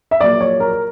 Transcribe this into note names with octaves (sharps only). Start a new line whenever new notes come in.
E5
A#1 A#2 F#3 A#3 D5
C#5
A#4